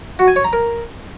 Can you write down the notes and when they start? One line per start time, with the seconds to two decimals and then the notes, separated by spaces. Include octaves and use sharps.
0.19 F#4
0.28 G#5
0.36 C#5
0.44 A#5
0.53 A#4